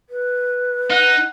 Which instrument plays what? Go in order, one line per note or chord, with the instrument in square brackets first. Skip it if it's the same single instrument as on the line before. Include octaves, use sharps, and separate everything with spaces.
[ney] B4
[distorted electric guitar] D#4 [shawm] F#5